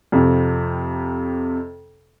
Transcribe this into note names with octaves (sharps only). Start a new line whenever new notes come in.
F2 C3